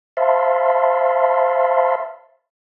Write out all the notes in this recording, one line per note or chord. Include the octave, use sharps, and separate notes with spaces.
C5 E5 F5 A5 B5 C6